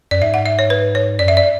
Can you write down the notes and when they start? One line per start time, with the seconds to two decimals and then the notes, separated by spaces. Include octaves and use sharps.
0.11 F#2 D5
0.22 G#2 E5
0.34 F#5
0.46 E5
0.59 C#5
0.70 B4
0.95 C#5
1.19 F#2 D5
1.28 E5
1.37 D5